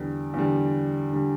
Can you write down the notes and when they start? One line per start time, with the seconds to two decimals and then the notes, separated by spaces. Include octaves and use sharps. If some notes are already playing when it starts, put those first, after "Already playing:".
Already playing: E2 D3 G3
0.34 E2 D3 G3
1.12 D3 G3